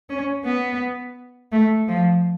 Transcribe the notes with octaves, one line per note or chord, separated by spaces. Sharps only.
C#4
B3
A3
F3